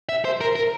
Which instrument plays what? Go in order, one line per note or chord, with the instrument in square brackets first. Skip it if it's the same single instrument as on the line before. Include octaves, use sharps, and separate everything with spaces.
[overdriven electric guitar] E5
C5
A#4
A#4